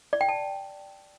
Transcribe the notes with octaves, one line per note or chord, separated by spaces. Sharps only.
D5
G5
A5